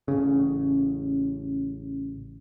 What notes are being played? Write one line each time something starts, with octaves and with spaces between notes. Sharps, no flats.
A1 C#3